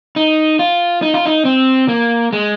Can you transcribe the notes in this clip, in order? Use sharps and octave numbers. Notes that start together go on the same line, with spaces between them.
D#4
F4
D#4
F4
D#4
C4
A#3
G#3